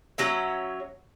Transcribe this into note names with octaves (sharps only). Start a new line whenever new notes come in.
F#3 C#4 E5